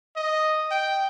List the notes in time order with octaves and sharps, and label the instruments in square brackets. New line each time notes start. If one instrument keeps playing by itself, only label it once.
[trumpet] D#5
G5